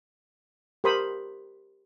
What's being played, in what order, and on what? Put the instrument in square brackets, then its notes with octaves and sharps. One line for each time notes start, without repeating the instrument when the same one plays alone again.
[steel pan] G4 A#4 C5 B5 D#6